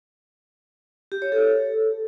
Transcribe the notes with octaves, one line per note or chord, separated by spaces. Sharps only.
G4
C#5
A4